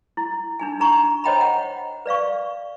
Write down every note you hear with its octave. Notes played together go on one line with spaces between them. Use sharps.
E4
D4 D#4 G#5
D4 D#4 A#5 C#6
C5 C#5 D#5 G5 A#5 B5
F#5
B4 D5 F5 C#6